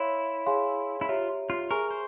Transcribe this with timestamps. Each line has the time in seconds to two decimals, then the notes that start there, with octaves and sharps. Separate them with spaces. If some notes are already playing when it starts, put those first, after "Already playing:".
Already playing: E4 C#5 F5 C6
0.46 G#4 C#5 F5 G#5 C6
1.01 E4
1.09 F4 G4 C#5 E5 A#5
1.50 F4
1.71 G#4 A#4 E5 G#5 C#6
1.91 C5